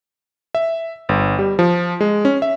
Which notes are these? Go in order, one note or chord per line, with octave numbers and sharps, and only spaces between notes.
E5
G1
G3
F3
G#3
C#4
E5